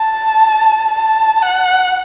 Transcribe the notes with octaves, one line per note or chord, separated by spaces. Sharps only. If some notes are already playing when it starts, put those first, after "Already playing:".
Already playing: A5
A5
F#5